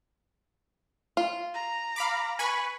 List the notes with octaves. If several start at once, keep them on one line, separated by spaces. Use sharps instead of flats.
F4
A#5
F5 B5 D6
B4 G#5 B5 C#6